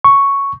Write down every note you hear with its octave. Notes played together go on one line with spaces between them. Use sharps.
C#6